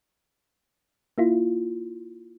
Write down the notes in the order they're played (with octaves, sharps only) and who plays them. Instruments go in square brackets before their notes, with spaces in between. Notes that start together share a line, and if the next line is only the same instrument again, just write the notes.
[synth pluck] A#3 E4 F4